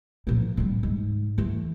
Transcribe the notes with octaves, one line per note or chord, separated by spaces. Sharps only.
A#2 F3
D1 G3
G#2
E3 A3